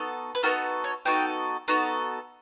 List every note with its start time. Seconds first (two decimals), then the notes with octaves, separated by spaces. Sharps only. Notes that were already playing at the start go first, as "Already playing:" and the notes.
Already playing: B3 D#4 F#4 A4
0.35 B4
0.43 B3 D#4 F#4 A4 A#4
0.84 C#5
1.05 B3 D#4 F#4 A4 G5
1.68 B3 D#4 F#4 A4 A#5